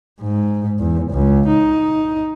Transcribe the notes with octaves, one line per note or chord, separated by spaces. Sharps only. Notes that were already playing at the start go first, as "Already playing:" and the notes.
G#2
E2
C#2
D#4